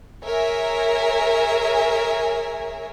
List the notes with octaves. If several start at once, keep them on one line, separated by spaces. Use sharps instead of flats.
G#4 A#4 C#5 E5 G#5